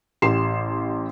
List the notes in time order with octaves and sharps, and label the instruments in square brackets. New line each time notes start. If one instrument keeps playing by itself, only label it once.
[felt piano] A1 G4 C6 C7 E7